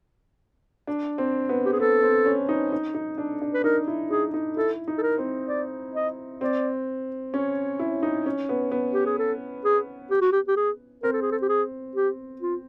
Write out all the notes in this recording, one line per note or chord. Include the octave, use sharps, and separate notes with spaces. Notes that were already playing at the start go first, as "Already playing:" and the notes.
D4
C4
B3
G4
G#4
B3 A4
C4
C#4
D#4
D#4
D#4
D4
D4
B4
D#4 A#4
E4
D#4 G#4
D#4
E4 A4
D#4
A4
A#4
C4
D5
D#5
C4 D5
C#4 C#5
E4
D#4
C#4
B3
B3
G4
G#4
A4
G#4
G4
F#4
G4
G4
G#4
C4 A#4
A4
G#4
A4
G4
G#4
G4
F4